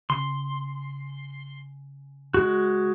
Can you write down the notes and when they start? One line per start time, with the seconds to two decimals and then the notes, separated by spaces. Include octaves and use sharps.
0.10 C#3 C6
2.34 G#3 F#4